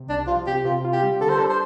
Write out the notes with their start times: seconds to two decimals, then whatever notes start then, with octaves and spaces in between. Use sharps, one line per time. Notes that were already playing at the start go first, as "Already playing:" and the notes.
Already playing: C3
0.09 C2 D4
0.27 F3 F4
0.47 C3 G4
0.65 C3 F4
0.85 F4
0.93 G4
1.03 G3
1.21 D3 A4
1.29 C5
1.39 D4 A4
1.50 C5